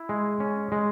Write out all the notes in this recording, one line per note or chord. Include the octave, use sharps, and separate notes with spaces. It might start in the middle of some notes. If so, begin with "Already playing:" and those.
Already playing: E4
G#3
C#4
G#3